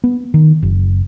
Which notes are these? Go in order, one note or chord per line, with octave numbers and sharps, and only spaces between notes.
B3
D#3
F#1